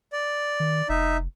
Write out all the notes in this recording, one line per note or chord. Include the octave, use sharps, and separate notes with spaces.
D5
D#3
F1 D#4 E5